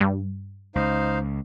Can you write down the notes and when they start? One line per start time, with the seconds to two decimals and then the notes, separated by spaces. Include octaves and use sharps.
0.01 G2
0.75 C#2 D#4 C5 F5